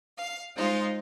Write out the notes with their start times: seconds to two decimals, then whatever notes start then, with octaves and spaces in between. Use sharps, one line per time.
0.17 F5
0.56 G#3 D#4 F4 C5